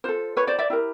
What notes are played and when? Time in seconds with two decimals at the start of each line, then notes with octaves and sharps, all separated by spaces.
0.04 F4 A4 C5
0.37 B4 C#5
0.47 C5 D5
0.59 D5 E5
0.70 E4 G4 A#4